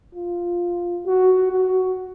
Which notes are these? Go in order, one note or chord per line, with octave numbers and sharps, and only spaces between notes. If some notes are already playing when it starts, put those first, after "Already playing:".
F4
F#4
F#4